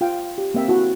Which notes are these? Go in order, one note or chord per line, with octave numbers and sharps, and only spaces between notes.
F4 F5 G5
G4
A#3 C4 E5 G5
E4 F#4